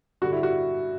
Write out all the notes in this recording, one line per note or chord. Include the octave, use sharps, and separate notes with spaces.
G2 D3 F#4
E4
F#4